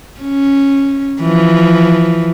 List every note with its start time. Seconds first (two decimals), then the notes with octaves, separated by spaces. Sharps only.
0.21 C#4
1.22 E3 F3